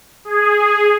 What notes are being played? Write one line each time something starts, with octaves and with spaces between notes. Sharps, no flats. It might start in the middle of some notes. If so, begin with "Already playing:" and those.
G#4